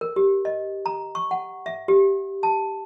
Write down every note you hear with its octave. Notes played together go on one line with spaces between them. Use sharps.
A#4
G4
D#5
A#5
C#6
F#5
E5
G4
A5